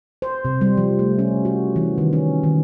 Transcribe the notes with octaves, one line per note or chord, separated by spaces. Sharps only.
C5
C3
G3
F3
A3
C#4
F#4
E3
D#3
C#4
D#3